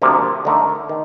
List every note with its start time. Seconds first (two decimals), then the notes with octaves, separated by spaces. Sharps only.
0.02 D2 C3 F3 A#3 D4
0.45 D3 A3 D#4 A#4
0.89 D#3